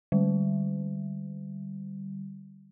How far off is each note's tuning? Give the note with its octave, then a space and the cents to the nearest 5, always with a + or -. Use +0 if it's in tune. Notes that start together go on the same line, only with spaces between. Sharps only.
D3 +25 G3 -10